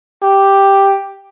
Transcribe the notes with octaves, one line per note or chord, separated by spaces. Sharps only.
G4